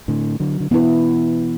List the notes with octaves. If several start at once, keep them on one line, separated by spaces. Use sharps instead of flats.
A2 D3
D3 F#3
D3
B2 E3 B3 E4 B4